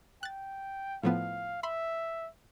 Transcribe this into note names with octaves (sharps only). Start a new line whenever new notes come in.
G5 F#6 A6
A2 F3 B3 F5
E5 B5 C6